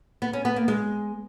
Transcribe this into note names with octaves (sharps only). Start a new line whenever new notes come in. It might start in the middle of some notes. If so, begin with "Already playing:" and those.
B3
C#4
B3
A#3
G#3